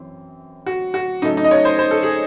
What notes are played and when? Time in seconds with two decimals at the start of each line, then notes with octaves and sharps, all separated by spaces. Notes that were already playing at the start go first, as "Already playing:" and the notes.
Already playing: F#2 E3 C4
0.66 F#4
0.94 F#4
1.22 C#3 F#3 A3 C#4 D#4
1.37 D#4
1.44 D#5
1.51 C#5
1.65 C5
1.79 C5
1.91 A4
2.03 G#4